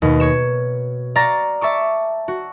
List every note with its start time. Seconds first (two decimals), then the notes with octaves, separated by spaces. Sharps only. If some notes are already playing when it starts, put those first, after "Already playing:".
0.02 D#2 B2
0.20 C#5 E7
1.16 D5 F5 A#5 C#6 A6 A#6
1.61 E5 A5 C#6 D6
2.28 F#4